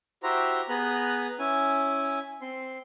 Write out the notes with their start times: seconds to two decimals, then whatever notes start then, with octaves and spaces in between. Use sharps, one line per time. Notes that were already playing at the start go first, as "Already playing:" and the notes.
0.23 E4 F#4 G4 C5 A#5
0.69 B3 G#4 B4 A#5 F#6
1.39 C#4 E4 G#5
2.42 C4 C6